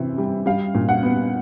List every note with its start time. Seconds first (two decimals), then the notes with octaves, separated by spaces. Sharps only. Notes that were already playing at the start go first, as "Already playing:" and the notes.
Already playing: C3 E3
0.18 G3
0.46 G3 F5
0.75 A#2
0.89 F#5
1.03 B3